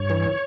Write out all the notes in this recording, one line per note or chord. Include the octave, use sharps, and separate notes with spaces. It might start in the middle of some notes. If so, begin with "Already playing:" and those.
Already playing: G2 C#5
E3